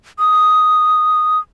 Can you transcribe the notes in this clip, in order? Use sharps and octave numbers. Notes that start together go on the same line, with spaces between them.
D#6